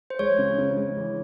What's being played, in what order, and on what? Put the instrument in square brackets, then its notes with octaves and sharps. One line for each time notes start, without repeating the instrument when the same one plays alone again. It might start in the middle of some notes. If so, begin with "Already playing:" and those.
[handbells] C5
[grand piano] G#3 [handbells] C#5
[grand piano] C#3
C#3
G#3
E3